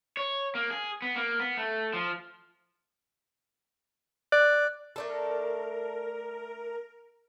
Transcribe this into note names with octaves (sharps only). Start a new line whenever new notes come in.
C#5
A#3
G#4
B3
A#3
B3
A3
F3
D5 F#6
A3 D4 A4 A#4